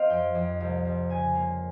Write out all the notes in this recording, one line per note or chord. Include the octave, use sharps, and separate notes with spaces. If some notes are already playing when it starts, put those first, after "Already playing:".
Already playing: C4 D#5 F5
F2 G5
F2
C2
C2
C#3 G#5
A#3